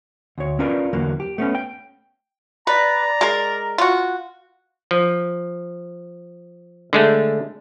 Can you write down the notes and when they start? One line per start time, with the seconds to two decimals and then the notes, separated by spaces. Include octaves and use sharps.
0.38 D2 C#5
0.59 C#4 D4 F4 A#4 B4 D5
0.93 E2 D3 F#3 A#3
1.20 G4
1.38 A3 B3 C#4
1.55 G5
2.67 B4 D5 A#5
3.21 G#3 A#4
3.78 F4 F#4
4.91 F3
6.93 D3 G#3 A3